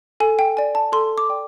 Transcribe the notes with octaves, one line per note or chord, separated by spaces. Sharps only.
A4 G#5
G5
D5 G5 G#5
A5
A4 C6
D6
D5 G5